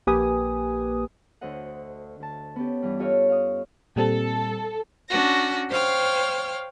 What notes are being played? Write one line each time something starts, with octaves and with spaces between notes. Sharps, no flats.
A#1 A#3 G4 B4 G#5 D#6
D2 D3 A4 C5 D#5 F#5
D2 A5
B3 C#4 G4
G2 E3 G3
F4 G4 A4 C#5 D#5 F5
F5 D#6
A#2 G3 C4 A4
C#4 D4 F#4 A#6
C5 C#5 F5 G5 F6